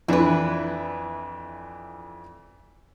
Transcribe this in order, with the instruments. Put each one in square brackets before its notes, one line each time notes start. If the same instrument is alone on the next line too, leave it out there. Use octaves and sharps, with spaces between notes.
[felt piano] F2 E3 D4 [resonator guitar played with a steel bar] E4 B4